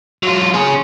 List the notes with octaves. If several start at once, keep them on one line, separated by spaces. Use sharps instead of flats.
F#3 F4
C#4 G#4